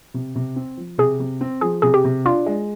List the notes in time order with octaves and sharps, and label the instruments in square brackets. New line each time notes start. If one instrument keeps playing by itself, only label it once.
[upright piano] C3
C3
C4
F3
[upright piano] C3 [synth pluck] G#4
[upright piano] C3
C4
[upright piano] F3 [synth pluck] G#4
[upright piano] C3 [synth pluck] G#4
[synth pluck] G4
[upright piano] C3
[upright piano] D4 [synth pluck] F4
[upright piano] G#3